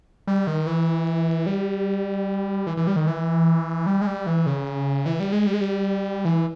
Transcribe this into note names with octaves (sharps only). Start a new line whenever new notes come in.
G3
D#3
E3
G3
E3
E3
G3
D#3
E3
G3
G#3
G3
E3
C#3
E3
G3
G#3
G3
G#3
G3
E3